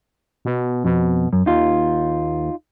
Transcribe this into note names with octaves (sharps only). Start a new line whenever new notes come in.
B2
F2 B2
F#2
D#2 D#4 F4